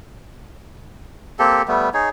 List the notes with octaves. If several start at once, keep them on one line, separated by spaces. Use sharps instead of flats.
A#3 C4 G4 A4
G3 A3 B3
D#4 G#4 C#5